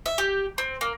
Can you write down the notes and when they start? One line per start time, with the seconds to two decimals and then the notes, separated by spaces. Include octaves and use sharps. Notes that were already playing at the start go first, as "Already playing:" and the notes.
0.06 E5
0.18 G4
0.58 C4
0.81 A#3